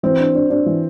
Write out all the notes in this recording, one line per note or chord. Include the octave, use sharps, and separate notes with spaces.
E3 C4
D4
D4
D4
E3